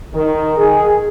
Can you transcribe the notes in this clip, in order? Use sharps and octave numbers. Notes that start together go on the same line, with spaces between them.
D#3
G#4